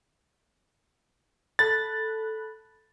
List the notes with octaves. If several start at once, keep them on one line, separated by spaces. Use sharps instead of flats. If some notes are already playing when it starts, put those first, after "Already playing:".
A4 B5 F#6 A6